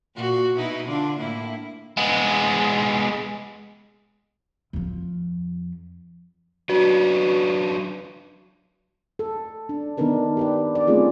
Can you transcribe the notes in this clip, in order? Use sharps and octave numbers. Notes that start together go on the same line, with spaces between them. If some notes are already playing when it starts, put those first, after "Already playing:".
A#2 F#4
B2 D#4 E4
D3 D4 F4
A2 A#3 E4
G#3 B3
F2 F3
F#3 D4 F#4 B4
A4
D4
D#3 B3 D4 D#4 A#4 B4
G4 B4 D5
D5
A3 C4 C#4 F4 G#4